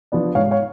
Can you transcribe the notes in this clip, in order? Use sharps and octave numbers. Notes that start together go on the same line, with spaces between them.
F3 B3 D4
G#2 C#5 F5
C#5 F5